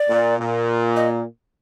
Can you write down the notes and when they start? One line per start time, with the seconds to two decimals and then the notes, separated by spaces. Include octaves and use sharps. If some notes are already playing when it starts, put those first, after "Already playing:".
Already playing: D5
0.08 A#2
0.39 A#2
0.96 D#5